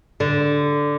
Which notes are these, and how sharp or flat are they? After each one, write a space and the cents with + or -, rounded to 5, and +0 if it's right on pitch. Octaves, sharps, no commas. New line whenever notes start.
D3 -5